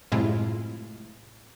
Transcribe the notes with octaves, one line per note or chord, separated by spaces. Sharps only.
F#2 A2 C3 G#3 E4 F4